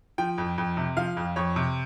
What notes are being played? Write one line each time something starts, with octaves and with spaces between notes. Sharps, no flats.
F3 G5
F2
F2
C3
F3 F5
F2
F2 C#5
C3